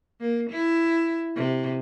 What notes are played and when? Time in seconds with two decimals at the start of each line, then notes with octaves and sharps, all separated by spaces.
0.20 A#3
0.50 E4
1.36 C3